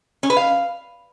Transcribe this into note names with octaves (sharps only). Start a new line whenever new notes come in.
C#4
B4
F5